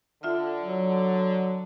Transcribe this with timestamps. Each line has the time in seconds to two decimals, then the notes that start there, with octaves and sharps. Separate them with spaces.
0.23 D3 F4 E5 F6
0.61 F#3